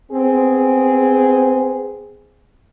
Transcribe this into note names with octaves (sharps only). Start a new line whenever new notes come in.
B3 C4 G#4